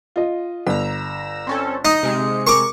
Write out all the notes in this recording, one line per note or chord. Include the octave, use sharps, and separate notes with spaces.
F4 D#5
G1 A#5 E6
C4 C#4 A4
D#4 D#5
C3 G#3 C#7
A#4 C#6 D6